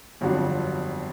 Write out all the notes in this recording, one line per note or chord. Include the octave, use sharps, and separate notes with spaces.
G1 F2 D3 F#3